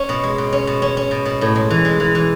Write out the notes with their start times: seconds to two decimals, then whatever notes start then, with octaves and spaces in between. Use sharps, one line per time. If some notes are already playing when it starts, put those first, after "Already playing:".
Already playing: C#4
0.09 B2
0.23 G#3
0.38 B2
0.52 C#4
0.67 B2
0.82 C#4
0.97 C#4
1.11 B2
1.25 B2
1.41 A2
1.56 G#3
1.70 E3
1.85 G#3
2.00 E3
2.15 E3